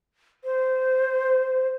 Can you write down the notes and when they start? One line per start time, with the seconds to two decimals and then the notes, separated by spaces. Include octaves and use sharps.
0.44 C5